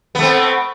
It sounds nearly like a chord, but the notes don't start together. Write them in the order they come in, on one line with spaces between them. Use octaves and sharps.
B3 A3 C4